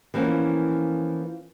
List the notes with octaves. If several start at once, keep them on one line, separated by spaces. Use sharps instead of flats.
E3 F3 A#3 B3 C#4